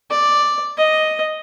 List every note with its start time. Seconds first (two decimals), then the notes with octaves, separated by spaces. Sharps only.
0.11 D5
0.77 D#5